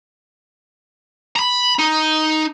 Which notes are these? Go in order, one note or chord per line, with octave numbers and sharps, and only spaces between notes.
A#5 B5
D#4